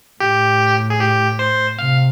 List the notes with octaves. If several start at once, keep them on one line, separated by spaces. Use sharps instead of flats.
A2 G4
G#4
G4
C5
C3 F5